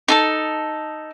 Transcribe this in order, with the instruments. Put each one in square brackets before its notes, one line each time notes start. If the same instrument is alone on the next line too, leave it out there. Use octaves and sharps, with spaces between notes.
[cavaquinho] D#4 A4 A5